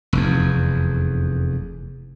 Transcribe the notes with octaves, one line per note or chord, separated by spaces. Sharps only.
F1 E2